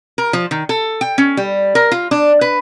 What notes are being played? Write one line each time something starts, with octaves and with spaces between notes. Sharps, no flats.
A#4
F3
D#3
A4
G5
C#4
G3
A#4
F4
D4
B4